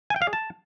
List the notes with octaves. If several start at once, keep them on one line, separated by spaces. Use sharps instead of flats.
G#5
G5
F5
G#4
A5